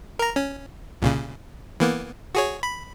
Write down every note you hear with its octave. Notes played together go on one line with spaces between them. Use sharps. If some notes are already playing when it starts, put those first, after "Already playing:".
A#4 A#5
C#4
C2 A#2 C#3
E3 A#3 B3
F#4 G#4 C#5
B5